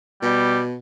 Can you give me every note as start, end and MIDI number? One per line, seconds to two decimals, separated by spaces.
0.22 0.77 47
0.22 0.59 55